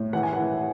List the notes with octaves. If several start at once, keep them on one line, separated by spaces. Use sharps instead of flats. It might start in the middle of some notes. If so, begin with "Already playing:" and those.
Already playing: A2
E3 F#5
G#5
E3 F#5